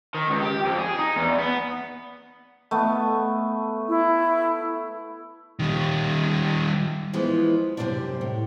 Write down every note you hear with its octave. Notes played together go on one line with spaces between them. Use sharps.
D#3
C#2
G4
F2
G#4
D#4
E2
B3
A3 B3
E4
D#3 G3
E3 F3 G#3 B3 F4
F#2 C3 F#3 G3 A#3 D4
A2